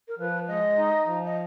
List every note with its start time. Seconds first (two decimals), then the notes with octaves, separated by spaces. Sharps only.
0.08 A#4
0.18 F3 B4
0.48 G#3 D#5
0.77 D#4
1.06 F3
1.25 D#5